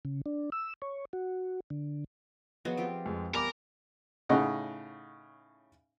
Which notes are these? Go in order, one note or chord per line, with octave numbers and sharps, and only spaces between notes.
C#3
D4
E6
C#5
F#4
D3
F3 F#3 B3 F#4 G#4 D#5
C4 F4 G4
F2 G#3
E3 G3 B3 A#4 G#5 B5 D6
A2 C#3 D#4 D#5 F#5